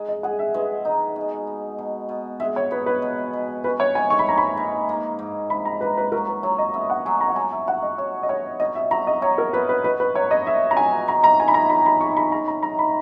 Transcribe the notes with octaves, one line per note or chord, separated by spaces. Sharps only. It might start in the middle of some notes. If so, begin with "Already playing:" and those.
Already playing: G#3 D#4
D#5
G#4 F#5
E5
G#3 B4
D#4 D#5
B2
B3
B2
B2
G#3 E5
C#5
B3 B4
B4
B2
B2
C#4 B4
C#5
G#2 G#5
C#6
B5
A#3 A#5
B5
G#2
A#3
G#2
G#2 B5
A#5
A#3 B4
B4
F#3 A#4
B4
F#3 C#5
D#5
B3 E5
F#5
F#3 G#5
A#5
F#5
F#3 G#5
E5
F#4 F#5
D#5
F#4 C#5
D#5
B3 C#5
B2 D#5
E5
F#3 A#5
D#5
F#3 C#5
A#4
B3 B4
B4
B2 B4
B4
F#3 C#5
D#5
B2 E5
A#5
F#3 G#5
D#3 A#5
A#5
D#3 G#5
B5
A#5
D#3 B5
B5
D#3 C#6
B5
C#4 A#5
A#5
D#3 A#5
B5